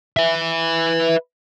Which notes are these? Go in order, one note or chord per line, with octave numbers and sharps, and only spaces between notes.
B4 E5